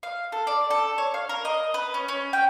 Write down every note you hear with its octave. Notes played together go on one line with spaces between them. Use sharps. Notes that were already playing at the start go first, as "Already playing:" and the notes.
F5
A4
D5
A4
C#5
F5
A#4
D#5
B4
C#4
C#4
G5